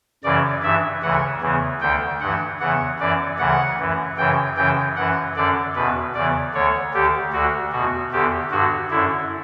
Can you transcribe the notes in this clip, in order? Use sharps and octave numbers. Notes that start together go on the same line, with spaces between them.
F#2 C#3 E3 D5
G2 E3 E5
D2 C#3 E3 F#5
E2 C#3 E3
D2 D3 G5
G2 E3 F#5
E2 C#3 E3 F#5
F#2 E3 D5
D2 C#3 E3 F#5
F#2 E3
F#2 C#3 E3 G5
F#2 C#3 E3 G5
F#2 E3 F#5
F#2 D3 D5
E2 B2 B4
E2 C#3 E3 D5
D2 D3 C#5
D2 D3 G4
D2 D3 F#4
E2 B2 F#4
E2 D3 G4
G2 D3 F#4
F#2 D3 E4